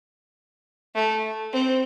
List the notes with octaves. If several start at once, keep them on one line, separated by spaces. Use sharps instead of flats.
A3
C4